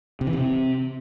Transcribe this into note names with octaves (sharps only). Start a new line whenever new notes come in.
C3
E3
C3